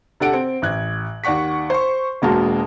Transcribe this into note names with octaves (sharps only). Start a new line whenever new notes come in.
C3 D4 A4 F#5 D7
C4
A1 F#6 G#6
D#2 D5 F#5 C#6 B6
C5 C#6
E1 B2 G#3 A#3 F#4 A5